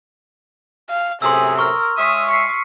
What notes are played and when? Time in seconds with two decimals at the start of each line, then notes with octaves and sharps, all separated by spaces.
0.89 F5
1.22 F#2 A2 C3 G#4 C6 D#6 E6
1.59 A#4 C#6 F6
1.98 G#3 C#5 E5 D#6
2.31 C#6 B6 C7 D#7